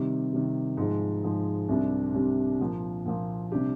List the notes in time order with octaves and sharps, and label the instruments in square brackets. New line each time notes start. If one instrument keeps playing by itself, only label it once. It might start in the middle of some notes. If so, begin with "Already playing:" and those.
Already playing: [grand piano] C3 D#3 G3
C3 D#3 G3
G#2 F3 G#3
G#2 F3 G#3
C2 C3 G3 D4
C2 C3 G3 D4
A#2 F3 A#3
A#2 F3 A#3
C3 G3 D4 G4